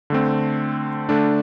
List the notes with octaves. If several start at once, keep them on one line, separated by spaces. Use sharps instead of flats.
D3 A3 C4
D3 A3 D4